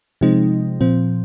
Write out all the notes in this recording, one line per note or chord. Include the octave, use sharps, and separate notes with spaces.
C3 F3 G#3 C4 D#4
A#2 F3 C4